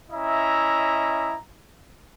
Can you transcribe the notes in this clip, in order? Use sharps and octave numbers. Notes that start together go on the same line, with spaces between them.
C#4 E4 D#5 E5 A#5